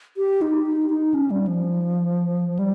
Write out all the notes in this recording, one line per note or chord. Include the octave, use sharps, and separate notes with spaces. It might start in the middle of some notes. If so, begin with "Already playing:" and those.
G4
D#4
D#4
D#4
C#4
G3
F3
G3